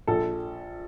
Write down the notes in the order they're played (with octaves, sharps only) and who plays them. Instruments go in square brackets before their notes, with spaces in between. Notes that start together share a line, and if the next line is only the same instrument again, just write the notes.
[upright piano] A#1 A4